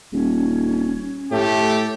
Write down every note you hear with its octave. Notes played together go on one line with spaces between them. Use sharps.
D#1 C#4
A2 A3 G4